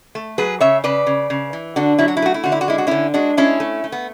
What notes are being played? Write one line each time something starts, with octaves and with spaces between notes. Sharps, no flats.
A3
F#3 G#4 B4
C#3 C#5 E5
C#3 B4 D5
C#3
C#3
E3
D3 D4 F#4
F#3 E4
F#4
E4
A3 F#4
E4
D3 F#4
E4
F#4
G#3 E4
F#4
D3 C#4 E4
G#3 D4 F#4
G#3 C#4 E4
A3
A3
B3